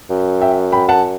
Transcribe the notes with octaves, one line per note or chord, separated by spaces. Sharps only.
F#2
E5 G5
G5 B5
F#5 A5